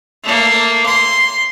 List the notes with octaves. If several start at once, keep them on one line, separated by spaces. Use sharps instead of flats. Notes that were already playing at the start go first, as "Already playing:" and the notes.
A3 A#3
C6